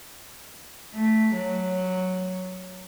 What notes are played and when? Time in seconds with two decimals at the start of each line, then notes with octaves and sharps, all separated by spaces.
0.94 A3
1.34 F#3